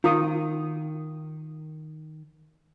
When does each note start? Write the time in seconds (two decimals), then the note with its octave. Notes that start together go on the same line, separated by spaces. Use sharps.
0.04 D#3 F4 D#6